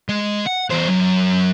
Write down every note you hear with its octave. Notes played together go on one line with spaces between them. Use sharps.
G#3
F#5
E2 C5
F#2